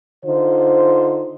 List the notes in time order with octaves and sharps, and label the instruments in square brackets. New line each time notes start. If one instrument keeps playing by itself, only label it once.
[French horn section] D3 D#4 F4 C5